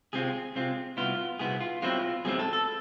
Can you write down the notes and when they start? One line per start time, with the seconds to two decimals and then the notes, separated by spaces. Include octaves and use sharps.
0.13 C3 G#3 C4 F4 G#4
0.55 C3 G#3 C4 F4
0.97 C2 B2 B3 E4 F4
1.39 C2 B2 B3 E4 G#4
1.61 F4
1.82 B1 B2 G#3 C4 E4 F4
2.25 B1 B2 G#3 C4 E4 G#4
2.39 A4
2.53 A4